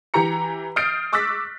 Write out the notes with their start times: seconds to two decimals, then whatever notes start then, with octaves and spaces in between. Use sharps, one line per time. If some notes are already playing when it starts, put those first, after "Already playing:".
0.14 E3 G4 A#5 C#7
0.76 D#6 F6 G6 A6 C7 D7
1.13 C#6 D6 E6 F#6 A6 B6